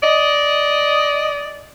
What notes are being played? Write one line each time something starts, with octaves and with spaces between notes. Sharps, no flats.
D5 D#5